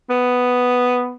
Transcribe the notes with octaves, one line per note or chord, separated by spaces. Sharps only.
B3